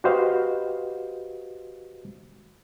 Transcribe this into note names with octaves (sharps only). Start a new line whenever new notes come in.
F#4 G4 B4 C5 D#5 F5